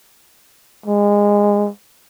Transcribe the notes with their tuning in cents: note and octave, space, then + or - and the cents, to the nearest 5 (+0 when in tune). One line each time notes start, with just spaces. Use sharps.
G#3 -20